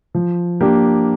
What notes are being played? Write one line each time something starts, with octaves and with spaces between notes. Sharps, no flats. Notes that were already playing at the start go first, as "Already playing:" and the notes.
F3
A#3 D4 G4